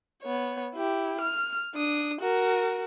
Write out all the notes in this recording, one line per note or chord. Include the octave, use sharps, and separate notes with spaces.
B3 C#5
E4 G4
F6
D4 D#6
F#4 A#4